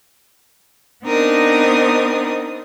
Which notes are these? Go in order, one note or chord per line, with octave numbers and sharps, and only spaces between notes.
B3 C4 D4 D#4 A#4 D#6